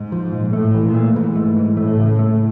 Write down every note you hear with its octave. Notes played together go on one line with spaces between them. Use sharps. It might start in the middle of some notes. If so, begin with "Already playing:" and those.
Already playing: G#2
F3
A#2
A2 A3
E3
A#2
A3
G#2 E3
A3
E3
A2 A3
C#3
A3